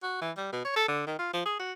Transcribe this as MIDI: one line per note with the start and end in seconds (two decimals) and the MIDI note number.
0.03 0.19 66
0.22 0.31 52
0.37 0.50 55
0.52 0.61 47
0.65 0.72 73
0.76 0.84 69
0.88 1.03 50
1.07 1.15 51
1.19 1.31 65
1.33 1.45 53
1.45 1.57 68
1.59 1.72 66